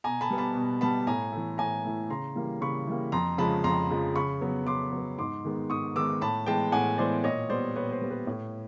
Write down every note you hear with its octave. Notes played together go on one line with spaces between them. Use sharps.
B2 G#5 A#5
A5 B5
G3 B3
A5 B5
B2
G3 B3 A5 B5
A2 G#5 A#5
E3 A3
A2 G#5 A#5
E3 A3
C#3 A#5 C6
E3 G3 A#3
C#3 B5 C#6
E3 G3 A#3
F2 A#5 C6
C#3 F3 G#3 A5 B5
F2 A#5 C6
C#3 F3 G#3
C#3 B5 C#6
F#3 B3
C#3 C6 D6
F#3 B3
G#2 C6 D6
D#3 G#3 B3
G#2 C#6 D#6
D#3 G#3 B3 D6 E6
A2 A5 B5
E3 G#3 B3 G5 A5
A2 F#5 G#5
E3 G#3 B3 C5 D5
A#2 C#5 D#5
G3 B3 C5 D5
A#2 B4 C#5
C5
G3 B3
B4
A2